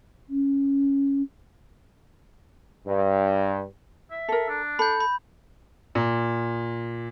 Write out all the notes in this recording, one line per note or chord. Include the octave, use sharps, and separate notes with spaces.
C#4
G2
E5
A4 A#4
D4
A4 B5 G6
B5
A#2